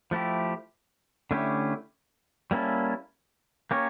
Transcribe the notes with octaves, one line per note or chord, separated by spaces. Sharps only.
F3 A3 E4 G4
D3 A3 C#4 E4 G4
G3 A#3 C#4 E4 A4
A#3 C#4 G4 A#4 C#5